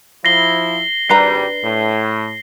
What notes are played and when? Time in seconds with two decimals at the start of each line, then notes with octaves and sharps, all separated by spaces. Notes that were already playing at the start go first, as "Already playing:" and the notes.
0.25 F3 E4 A#6 C7 G7
1.10 G#1 G3 D4 B4 A#5 C7
1.63 A2